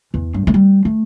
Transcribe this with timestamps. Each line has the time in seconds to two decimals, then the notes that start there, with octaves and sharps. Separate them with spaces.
0.14 E2
0.34 G2
0.47 A3
0.54 G3
0.85 A3